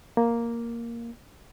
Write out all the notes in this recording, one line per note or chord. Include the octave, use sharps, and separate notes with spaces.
A#3